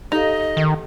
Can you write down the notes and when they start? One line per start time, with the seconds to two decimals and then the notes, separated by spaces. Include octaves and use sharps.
0.12 D#4 G4 A4 D#5 F5
0.57 D#3